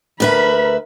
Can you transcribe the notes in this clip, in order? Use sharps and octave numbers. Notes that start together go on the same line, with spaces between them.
D2 A#4 B4 E5 B5